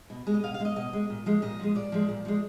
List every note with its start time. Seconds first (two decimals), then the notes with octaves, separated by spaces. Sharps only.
0.10 B2
0.27 G#3
0.34 D#5
0.44 B2 F5
0.54 F5
0.60 G#3
0.65 D#5
0.76 B2 D#5
0.93 G#3
1.10 A#2
1.26 F3 G#3
1.42 A#2 D#5
1.59 F3 G#3
1.75 A#2 D5
1.92 F3 G#3
2.09 A#2
2.25 F3 G#3